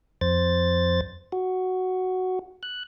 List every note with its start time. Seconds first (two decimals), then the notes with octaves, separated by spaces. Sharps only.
0.21 F2 C5 A6
1.32 F#4
2.63 F#6